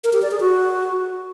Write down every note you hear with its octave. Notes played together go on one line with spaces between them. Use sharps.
A#4
G4
D5
G#4
F#4